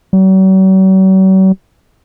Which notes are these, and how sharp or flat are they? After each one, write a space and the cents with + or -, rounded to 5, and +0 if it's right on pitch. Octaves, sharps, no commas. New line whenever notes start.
F#3 +45